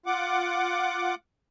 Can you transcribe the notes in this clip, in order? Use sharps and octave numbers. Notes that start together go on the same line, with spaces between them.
F4 F#5 D6